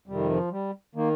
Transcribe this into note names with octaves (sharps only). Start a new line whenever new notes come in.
F2 C3 D#3 G3
F3
G3
D#3 A#3